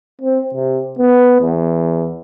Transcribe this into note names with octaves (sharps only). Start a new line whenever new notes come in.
C4
C3
B3
E2